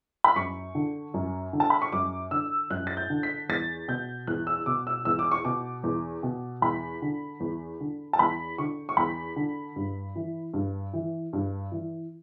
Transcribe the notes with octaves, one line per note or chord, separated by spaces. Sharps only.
B5
F#2 C#6
D3
F#2
D3
A5
B5
C#6
F#2 D6
D3 E6
F#2 F#6
A6
G6
D3
B6
E2 A6
B2 G6
E2 F#6
E6
B2 D6
E6
E2 E6
D6
C#6
B2 D6
E2
B2
E2 B5
D3
E2
D3
A5
E2 B5
D3 C#6
C#6
E2 B5
D3
G2
E3
G2
E3
G2
E3